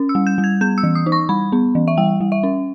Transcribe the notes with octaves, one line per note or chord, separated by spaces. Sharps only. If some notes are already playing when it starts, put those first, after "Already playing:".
Already playing: C#4
E6
G3
G6
G3
G#6
B3 G6
E6
E3
D#6
D#4
C#6
G3 B5
B3
E3
E5
G3 G5
G3
E5
C#4